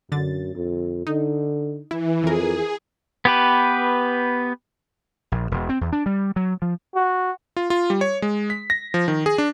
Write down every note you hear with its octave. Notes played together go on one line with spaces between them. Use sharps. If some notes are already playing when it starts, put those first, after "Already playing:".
F#2 D3 A6
F2
D3 D#4
E3 E4
F2 E3 G#4 A#4
B3 G4 B4
A#1
E1
C4
E2
D4
G3
F#3
F3
F#4
F4
F4
G3
C#5
G#3
B6
A#6
F3
D#3
G#4
D4